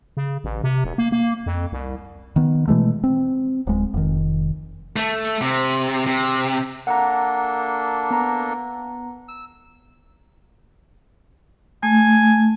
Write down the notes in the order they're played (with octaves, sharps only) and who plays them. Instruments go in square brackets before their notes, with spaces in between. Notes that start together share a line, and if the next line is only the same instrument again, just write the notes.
[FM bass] C#3
A1
C3
E1
A#3
A#3
F2
C2
[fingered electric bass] D#3 B3
B2 E3 G#3 A3
C4
D1 G#3
F1 D#3
[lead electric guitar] A3
C3
C3
[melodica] A#3 D4 A4 [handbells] F#5 A#5
[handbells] B3 A#5
[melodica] E6
[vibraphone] A3 [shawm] G#5